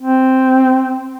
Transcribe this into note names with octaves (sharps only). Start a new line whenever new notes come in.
C4